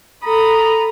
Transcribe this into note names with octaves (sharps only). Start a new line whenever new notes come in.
A4 A#5 B5 D#6